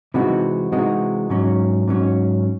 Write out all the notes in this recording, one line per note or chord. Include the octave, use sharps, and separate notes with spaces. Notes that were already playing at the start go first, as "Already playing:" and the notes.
C3 E3 G#3 D#4 F#4
C3 E3 G#3 D#4 F#4
G#2 F#3 C#4
G#2 F#3 C#4